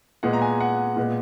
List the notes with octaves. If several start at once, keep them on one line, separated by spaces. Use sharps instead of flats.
A#2 G#3 B3 F#5
A#5
G#5
F#5
A#2 G#3 B3